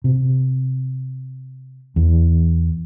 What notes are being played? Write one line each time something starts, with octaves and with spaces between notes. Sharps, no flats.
C3
E2